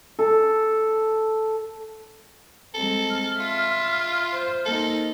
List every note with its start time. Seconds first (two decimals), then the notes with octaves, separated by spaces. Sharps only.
0.19 A4
2.74 G#3 C4 A4
3.10 F6
3.40 F4 E5
4.33 C5
4.66 A#3 D#4 A4